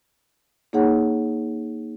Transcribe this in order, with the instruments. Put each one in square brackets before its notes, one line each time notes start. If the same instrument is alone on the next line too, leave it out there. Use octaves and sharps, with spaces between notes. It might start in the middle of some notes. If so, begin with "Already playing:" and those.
[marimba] A#3 D#4 G#4 C#5 F#5